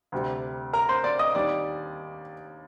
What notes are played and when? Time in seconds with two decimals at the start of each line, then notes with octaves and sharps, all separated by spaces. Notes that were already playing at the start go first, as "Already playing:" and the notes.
0.12 D2 C3 G3
0.73 A#4 A#5
0.89 C5 C6
1.04 D5 D6
1.19 D#5 D#6
1.35 D#2 D#3 G3 D5 D6